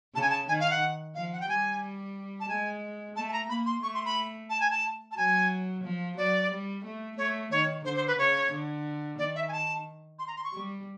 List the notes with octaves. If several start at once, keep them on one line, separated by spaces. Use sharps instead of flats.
C#3 A5
G#5
A5
D#3 G#5
F5
F#5
F3 F5
F#5
G5
G3 G#5
A5
G#3 G#5
A3 A5
A5
A#5
A#3 B5
C6
A3 C#6
C6
B5
A5
G#5
A5
A5
F#3 G#5
F3
F#3 D5
G3
A3
A3 C#5
D#3 C#5
D3 C5
C5
B4
C#3 C#5
D3
D#3 D5
E5
G#5
A5
C6
A#5
C6
C#6
G3